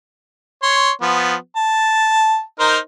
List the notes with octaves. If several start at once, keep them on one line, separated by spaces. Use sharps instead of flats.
C#5 C6
F3 B3
A5
D#4 A#4 C5